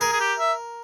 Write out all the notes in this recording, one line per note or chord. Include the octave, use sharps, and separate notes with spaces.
G#4 A#4
G#4
G4
E5